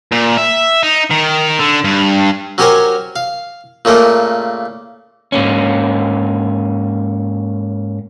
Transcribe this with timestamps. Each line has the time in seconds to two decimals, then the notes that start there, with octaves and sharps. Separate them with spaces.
0.12 A#2
0.37 E5
0.83 D#4
1.10 D#3
1.59 D3
1.84 G2
2.58 F#3 C#4 G4 A#4 C5 G#5
3.16 F5
3.85 A#2 C#3 A3 A#3
5.32 G#2 A#3 C#4